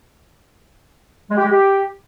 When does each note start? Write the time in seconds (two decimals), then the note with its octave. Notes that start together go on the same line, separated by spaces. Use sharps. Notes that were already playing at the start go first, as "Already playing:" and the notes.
1.30 G#3
1.37 G4
1.44 G#3
1.51 G4